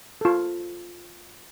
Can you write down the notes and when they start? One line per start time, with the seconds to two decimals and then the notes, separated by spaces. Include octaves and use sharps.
0.21 F4 A4